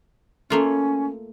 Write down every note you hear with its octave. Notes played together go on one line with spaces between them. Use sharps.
A3 A#3 C#4 F4